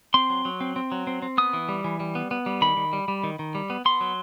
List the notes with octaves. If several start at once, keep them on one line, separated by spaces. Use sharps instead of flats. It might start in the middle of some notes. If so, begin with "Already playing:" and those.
C4 C6
F#3
F#3
C4
C4
F#3
C4
C4
B3 D#6
E3
G3
E3
G3
B3
B3
G3
D#3 B5
D#3
G3
G3
D#3
D#3
G3
B3
B3 C6
F#3